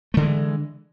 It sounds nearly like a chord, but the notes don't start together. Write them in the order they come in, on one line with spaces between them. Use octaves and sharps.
A3 D3 G#3 E3